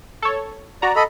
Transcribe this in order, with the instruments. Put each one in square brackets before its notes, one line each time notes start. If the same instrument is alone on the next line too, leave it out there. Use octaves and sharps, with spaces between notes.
[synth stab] A4 C#5
[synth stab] F#4 A#5 [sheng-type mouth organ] D5
[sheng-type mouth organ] A4 D#5 B5